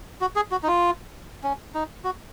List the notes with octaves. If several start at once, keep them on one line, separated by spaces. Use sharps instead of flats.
F#4
G#4
F#4
D#4
F4
C#4
D#4
F#4